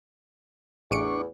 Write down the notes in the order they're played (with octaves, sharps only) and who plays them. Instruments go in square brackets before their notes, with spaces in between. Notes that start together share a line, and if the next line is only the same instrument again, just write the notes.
[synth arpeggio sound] A1 C#7 D7 [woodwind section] E2 [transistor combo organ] D4 C#6